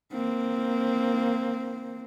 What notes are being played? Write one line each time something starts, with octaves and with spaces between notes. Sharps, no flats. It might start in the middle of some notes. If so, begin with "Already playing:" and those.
A#3 C4